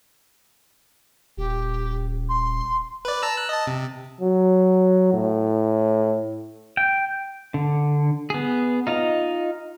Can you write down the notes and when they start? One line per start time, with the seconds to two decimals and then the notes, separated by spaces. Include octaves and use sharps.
1.37 D#1 G4
2.29 C6
3.05 B4 D5
3.23 A5 A#5 E6
3.35 E6 F#6
3.49 D#5 A5
3.67 C3
4.21 F#3
5.13 A2
6.77 G5
7.54 D3
8.30 B3 G#4
8.87 D#4 F4 D#5 A#5